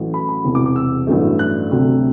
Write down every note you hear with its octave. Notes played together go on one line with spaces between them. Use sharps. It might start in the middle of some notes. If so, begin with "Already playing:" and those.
Already playing: A1 A2 F#3
B5
B5
E1 E2 C3
D6
D6
E6
A1 G2 F#3 A3
F#6
D2 C3 F#3 A3